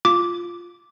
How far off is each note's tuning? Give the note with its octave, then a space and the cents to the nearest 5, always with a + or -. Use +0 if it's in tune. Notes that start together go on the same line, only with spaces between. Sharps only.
F4 +0 D6 -5